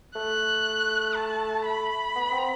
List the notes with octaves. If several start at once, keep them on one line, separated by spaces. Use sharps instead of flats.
A3 F#6
A5
B5
B3
C4